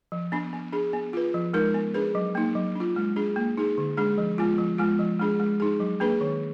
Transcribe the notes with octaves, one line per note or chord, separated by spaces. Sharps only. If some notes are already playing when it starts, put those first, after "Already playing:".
F3
B3 D4
B3
D4 G#4
B3
F4 B4
F3
G#3 D#4 A#4
B3
D4 G#4 B4
F#3
A#3 D#4
F#3
D4 F4
G#3
D4 G#4
A#3
D#4 G#4
D3
G#3 D4 G#4
F3
G#3 B3 F4
F3
G#3 B3 F4
F3
G#3 D4 G#4
G#3
D#4 G#4
F#3
A#3 D4 G#4 B4
D#3